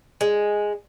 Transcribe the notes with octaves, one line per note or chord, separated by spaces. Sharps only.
G#3